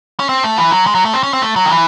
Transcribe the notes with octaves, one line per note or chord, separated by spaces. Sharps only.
C#4
C4
A3
E3
F#3
G#3
F#3
A3
C4
C#4
C4
A3
F#3
D#3
E3